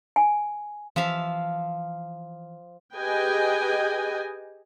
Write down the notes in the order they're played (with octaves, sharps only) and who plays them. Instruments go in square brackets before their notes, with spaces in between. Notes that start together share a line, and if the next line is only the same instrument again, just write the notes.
[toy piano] G#5
[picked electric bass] E3 [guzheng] F3 E5 F5
[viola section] G4 G#4 B4 D#5 G5 G#5